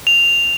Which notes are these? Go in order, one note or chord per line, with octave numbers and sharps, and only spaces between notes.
F7